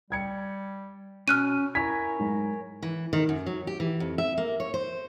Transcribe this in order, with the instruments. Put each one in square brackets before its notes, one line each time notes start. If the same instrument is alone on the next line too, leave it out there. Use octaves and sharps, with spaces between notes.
[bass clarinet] G3 [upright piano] G5 G#6 C#7
[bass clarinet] B2 [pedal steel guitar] C#4 [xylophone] F6 F#6 D#7
[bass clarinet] E4 [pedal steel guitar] A#4 C#5 G#5 [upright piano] B6
[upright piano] G#2 [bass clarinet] F#3
[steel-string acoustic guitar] E3
D#3
F#2
F#3
G4
E3
F2
E5
A#3
C#5
C5